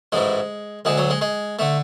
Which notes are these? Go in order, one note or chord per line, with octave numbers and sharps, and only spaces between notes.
A1 G#2 E3 G#3
D2 D3 G#3
F#3
G#3
G#3
D3 A3